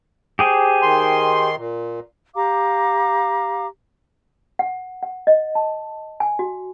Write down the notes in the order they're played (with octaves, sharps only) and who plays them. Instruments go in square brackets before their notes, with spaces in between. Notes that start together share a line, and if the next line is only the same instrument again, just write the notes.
[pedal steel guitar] G4 G#4 C5
[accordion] D#3 C6
A#2
[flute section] G4 F5 A#5 D6
[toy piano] F#5
F#5
D#5
A5
G#5
F#4